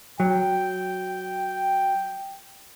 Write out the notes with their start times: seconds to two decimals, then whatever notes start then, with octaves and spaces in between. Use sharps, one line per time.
0.20 F#3 G5